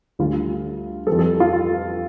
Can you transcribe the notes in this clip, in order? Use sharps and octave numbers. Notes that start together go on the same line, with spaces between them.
D2 D3 G3 F4
F2 E3 G3 A4
A4
F4